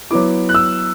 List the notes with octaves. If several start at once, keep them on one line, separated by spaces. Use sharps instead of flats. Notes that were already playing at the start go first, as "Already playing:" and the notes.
F#3 B3 E4 D6
F#6
E6